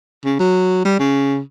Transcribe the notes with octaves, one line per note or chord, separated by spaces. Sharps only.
C#3
F#3
G3
C#3